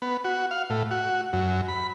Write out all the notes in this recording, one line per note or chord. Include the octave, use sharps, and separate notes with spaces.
B3
F#4
F5
A2
F#4
F#2
B5